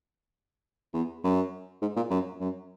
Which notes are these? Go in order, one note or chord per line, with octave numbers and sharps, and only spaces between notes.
E2
F#2
G#2
A#2
F#2
F#2